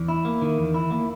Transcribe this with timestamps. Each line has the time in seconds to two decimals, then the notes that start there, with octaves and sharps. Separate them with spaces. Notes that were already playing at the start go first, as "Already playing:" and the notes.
Already playing: E2
0.08 E4
0.25 A#3
0.42 D#3
0.58 E2
0.74 E4
0.91 A#3